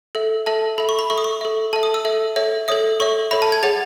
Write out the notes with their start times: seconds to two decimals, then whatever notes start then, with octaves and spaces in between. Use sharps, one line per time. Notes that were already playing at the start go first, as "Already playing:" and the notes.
0.15 A4 E5
0.46 A4 E5 A5
0.78 A4 E5 B5
0.89 C#6
0.99 B5
1.10 A4 E5 C#6
1.18 D#6
1.24 C#6
1.41 A4 E5
1.73 A4 A5
1.76 E5
1.83 D#6
1.94 E6
2.05 A4 E5
2.36 A4 C#5 E5
2.68 A4 C#5 E5 D#6
3.00 A4 C#5 E5 C#6
3.31 A4 C#5 E5 B5
3.42 A5
3.52 G#6
3.63 G#4 C#5 F#5 A6